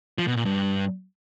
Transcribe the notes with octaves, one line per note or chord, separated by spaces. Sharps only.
F3
B2
A#2
G2